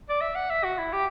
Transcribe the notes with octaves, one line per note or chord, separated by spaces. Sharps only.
D5
E5
F#5
E5
F#4
E4
G4